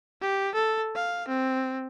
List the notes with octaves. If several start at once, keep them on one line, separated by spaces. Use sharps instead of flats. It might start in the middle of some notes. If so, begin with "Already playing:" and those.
G4
A4
F5
C4